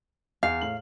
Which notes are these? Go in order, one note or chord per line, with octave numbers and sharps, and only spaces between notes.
E2 F5
A2 F#7